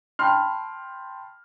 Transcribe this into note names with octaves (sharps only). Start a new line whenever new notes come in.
G5 A5 B5 C6 F6